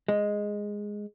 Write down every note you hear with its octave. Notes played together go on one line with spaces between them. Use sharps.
G#3